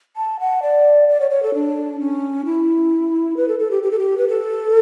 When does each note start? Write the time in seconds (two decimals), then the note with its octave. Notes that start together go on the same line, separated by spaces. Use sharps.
0.17 A5
0.40 F#5
0.62 D5
1.08 D5
1.20 C#5
1.30 C#5
1.43 A4
1.55 D4
2.00 C#4
2.45 E4
3.37 B4
3.48 A4
3.59 A4
3.71 G4
3.83 G4
3.91 A4
3.99 G4
4.18 B4
4.28 A4